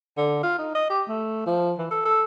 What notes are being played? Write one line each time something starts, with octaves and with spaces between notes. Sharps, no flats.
D3
F4
D#4
D#5
G4
A3
F3
E3
A4
A4